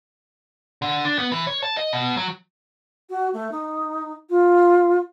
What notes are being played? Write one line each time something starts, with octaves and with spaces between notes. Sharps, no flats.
D3
D4
B3
E3
C#5
A5
D#5
B2
F#3
F#4
A3
D#4
F4